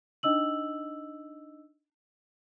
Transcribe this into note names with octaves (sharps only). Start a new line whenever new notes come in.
D4 D#4 D#5 E6 F#7